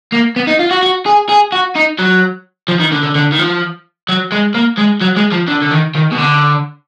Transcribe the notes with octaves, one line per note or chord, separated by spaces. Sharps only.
A#3
B3
D#4
F4
F#4
F#4
G#4
G#4
F#4
D#4
F#3
F3
D#3
D3
D3
D3
D#3
F3
F#3
G#3
A#3
G#3
F#3
G#3
F3
D3
D3
D#3
D#3
B2
D3